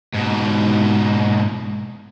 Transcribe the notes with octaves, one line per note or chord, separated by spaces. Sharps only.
G#2 B2